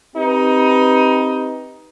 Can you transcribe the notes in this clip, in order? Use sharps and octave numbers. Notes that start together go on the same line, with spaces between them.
C4 D#4 G4 B4